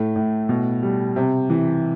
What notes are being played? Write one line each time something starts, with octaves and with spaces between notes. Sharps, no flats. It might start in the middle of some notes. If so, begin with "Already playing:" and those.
Already playing: A2 A3
A2
B2
G3
C3
E3